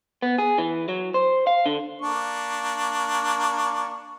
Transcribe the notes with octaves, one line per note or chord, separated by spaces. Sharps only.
B3
G#4
E3
F#3
C5
F5
D3
A#3 D4 C#6